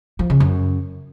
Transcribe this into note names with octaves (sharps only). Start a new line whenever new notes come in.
F3
C#3
F#2